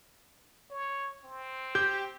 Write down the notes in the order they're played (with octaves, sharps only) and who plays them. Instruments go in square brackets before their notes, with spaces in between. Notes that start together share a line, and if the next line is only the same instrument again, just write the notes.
[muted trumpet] C#5
C4
[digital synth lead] G4 [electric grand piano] G6